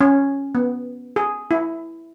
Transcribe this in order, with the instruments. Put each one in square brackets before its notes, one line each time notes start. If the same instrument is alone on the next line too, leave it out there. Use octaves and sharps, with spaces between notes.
[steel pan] C#4
B3
G#4
E4